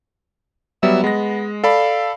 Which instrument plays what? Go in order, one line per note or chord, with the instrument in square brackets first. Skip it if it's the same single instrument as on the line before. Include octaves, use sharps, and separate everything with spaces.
[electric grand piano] F#3 G3 B3 [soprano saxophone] E5
[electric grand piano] G#3 A#6 [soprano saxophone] B3
[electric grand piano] A4 D5 B5 [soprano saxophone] F5